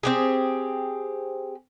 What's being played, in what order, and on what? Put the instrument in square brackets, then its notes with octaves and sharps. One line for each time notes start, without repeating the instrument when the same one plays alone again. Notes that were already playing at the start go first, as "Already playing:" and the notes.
[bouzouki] C4 G4 G#4